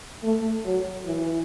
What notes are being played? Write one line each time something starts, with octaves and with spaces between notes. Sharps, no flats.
A3
F#3
E3